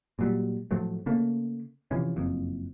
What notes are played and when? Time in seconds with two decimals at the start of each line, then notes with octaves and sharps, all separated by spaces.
0.19 A#2 F#3 G3
0.71 A2 F3 F#3 A3
1.06 C#3 A3 A#3
1.91 C3 E3 F3 C#4
2.16 F#1 F2